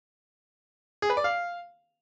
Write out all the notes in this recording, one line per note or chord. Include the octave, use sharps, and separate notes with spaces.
G#4
B4
D5
F5